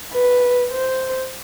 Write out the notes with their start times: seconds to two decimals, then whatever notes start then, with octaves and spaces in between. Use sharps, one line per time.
0.13 B4
0.72 C5